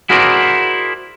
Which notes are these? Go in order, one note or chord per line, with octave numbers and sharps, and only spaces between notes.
E4 F#4 G#4 A#4 C5 D5